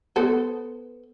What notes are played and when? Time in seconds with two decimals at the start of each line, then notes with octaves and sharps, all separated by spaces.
0.16 B3 A4 C5